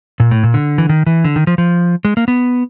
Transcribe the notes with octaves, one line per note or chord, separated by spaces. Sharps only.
A#2
A2
A#2
D3
E3
D#3
E3
D3
D#3
F3
F3
G#3
A#3
B3